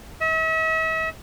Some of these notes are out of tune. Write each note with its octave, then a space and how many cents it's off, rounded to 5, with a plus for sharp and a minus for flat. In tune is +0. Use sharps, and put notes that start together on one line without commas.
E5 -40